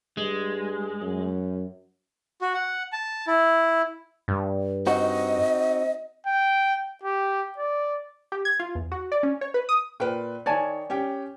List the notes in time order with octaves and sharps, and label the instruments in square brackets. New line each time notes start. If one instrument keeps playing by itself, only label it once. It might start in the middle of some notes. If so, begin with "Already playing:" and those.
[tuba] G2 [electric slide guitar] G#3
[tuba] F#2
[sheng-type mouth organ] F#4
F#5
A5
E4
[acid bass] G2
[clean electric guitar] C4 D#4 F#4 [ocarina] D#5
[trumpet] G5
G4
D5
[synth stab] G4
G#6
F4
E2
F#4
D5
C#4
C#5
B4
D#6
[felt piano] A#2 B4 [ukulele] A#4 G5
[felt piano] D#3 C#5 [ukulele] D5 G#5 A5
[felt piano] C#4 G4 G5